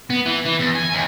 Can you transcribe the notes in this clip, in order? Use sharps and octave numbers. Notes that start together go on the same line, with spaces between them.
B3
E3
E3
E2
G#5
D#2